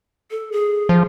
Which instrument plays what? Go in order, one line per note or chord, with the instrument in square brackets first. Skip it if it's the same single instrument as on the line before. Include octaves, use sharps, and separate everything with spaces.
[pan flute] A4
G#4
[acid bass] F3